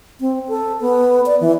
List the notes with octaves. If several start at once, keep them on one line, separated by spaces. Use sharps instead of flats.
C4
A4
B3
D5
E3